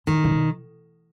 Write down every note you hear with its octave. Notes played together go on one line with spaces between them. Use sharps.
A2 D#3
C3
B2